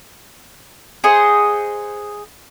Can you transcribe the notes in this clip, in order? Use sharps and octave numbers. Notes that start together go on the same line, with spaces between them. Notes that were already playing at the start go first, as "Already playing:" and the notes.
G#4 C5 D#5 F#5